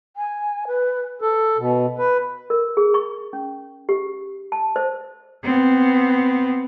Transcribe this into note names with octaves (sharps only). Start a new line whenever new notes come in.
G#5
B4
A4
B2
B4
A#4
G#4
C#6
C#4
G4
A5
C5
B3 C4